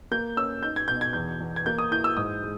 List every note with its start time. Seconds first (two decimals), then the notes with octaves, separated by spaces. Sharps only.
0.11 A#3 G6
0.37 C#4 E6
0.63 D#4 G6
0.76 G#6
0.88 B2 G6
1.01 G#6
1.13 E2 G6
1.40 E2
1.56 G#6
1.66 A#3 G6
1.78 D#6
1.91 E4 G6
2.04 E6
2.17 G#2 D#6
2.43 G#3